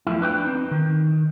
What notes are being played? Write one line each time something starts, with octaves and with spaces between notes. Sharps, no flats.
E2 F3 G#3 A3 E4
D4 B4 C#5 G5
C4 D#4
D#3